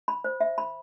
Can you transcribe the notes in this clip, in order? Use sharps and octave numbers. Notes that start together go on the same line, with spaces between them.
B5
C5
E5
B5